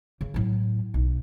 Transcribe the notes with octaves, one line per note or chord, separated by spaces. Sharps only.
C#3
A2 F#3
B1